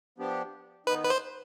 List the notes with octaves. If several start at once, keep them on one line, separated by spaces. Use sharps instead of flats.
F3 B3 D4 G4
D#3 B3 D#4 B4
B4
C5